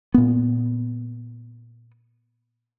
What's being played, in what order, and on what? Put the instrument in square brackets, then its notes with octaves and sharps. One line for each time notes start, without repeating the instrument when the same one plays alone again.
[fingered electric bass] A#2 B3